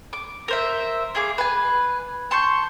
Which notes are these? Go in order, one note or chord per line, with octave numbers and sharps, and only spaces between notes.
D6
A#4 C5 E5
A#3 G#4 D6
B4 G#5
A5 C6 C#6 G6